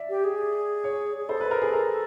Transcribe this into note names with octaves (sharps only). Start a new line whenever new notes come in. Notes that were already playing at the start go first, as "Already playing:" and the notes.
Already playing: D5 E5
G4
G#4
C#5
G#4
A4 C5
B4
A#4
G#4
A#4